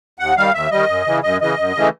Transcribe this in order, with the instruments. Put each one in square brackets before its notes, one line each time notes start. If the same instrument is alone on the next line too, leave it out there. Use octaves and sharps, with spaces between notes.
[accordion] D#2 F#5
D#3 G3 F5
D#2 E5
D#3 G3 D#5
F#2
C#3 E3
F#2 D#5
C#3 E3 D#5
F#2
C#3 E3 A3